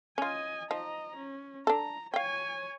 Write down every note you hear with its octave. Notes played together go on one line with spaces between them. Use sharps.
C#4 F4 D#5 G#5
F3 D#4 D#5 A#5
C#4
D4 A4 A#5
C#5 F5 G5 G#5